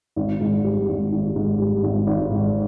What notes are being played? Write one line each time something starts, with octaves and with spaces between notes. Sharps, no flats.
G#1
G#2
G3
G#1
G#1
G#2
G3
G#1
G#1
G#2